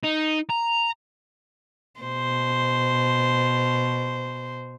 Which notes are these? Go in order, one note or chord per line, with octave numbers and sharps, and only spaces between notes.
D#4
A#5
B2 C5